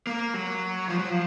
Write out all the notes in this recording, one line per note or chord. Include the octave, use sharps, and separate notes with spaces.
A#3
F#3
F3
F#3
F3